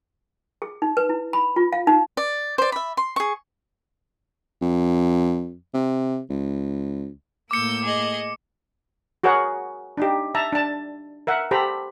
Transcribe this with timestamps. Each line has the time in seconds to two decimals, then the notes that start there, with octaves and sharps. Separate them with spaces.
0.62 G#4
0.82 D#4
0.97 B4
1.09 E4
1.33 B5
1.56 F4
1.73 F5
1.87 D#4
2.17 D5
2.58 C5 D5
2.72 E5 B5
2.97 C6
3.16 G#4 C#6
4.61 F2
5.74 C3
6.30 C#2
7.51 A2 A#3 D6 E6 G6 C#7
7.84 G#4 D#5
9.24 F#4 G#4 A#4 C#5 F#5
9.97 D4 D#4 G4
10.35 E5 A5 A#5
10.53 D4 A5
11.27 A#4 E5 F#5
11.51 G4 A4 C5 A#5 B5